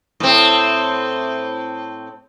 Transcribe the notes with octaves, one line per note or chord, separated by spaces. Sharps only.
A2 C4